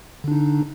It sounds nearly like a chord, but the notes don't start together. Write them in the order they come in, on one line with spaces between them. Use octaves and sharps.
D3 D4 D#4